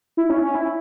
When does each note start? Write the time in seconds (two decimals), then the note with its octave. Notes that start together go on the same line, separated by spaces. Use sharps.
0.17 E4
0.30 C#4
0.42 C#4
0.55 E4